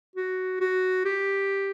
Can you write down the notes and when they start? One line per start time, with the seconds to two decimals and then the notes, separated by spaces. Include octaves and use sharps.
0.16 F#4
0.60 F#4
1.05 G4